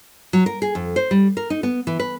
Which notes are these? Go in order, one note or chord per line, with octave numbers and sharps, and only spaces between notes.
F#3
A#4
G#4
F2
C5
G3
A#4
D#4
B3
E3
B4